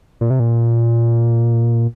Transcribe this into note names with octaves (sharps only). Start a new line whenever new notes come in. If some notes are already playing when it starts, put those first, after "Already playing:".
A#2
C3
A#2